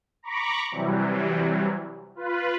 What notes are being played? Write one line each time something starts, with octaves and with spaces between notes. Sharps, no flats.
A#5 B5 C#6 D6
C3 E3 F#3 G3
F4 B4